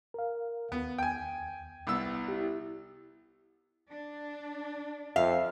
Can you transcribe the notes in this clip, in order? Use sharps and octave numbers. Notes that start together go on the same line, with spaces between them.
A#4 F5
D#2 B3
G5 G#5
C2 B3 E6
E4 G4
D4
F2 E5 F5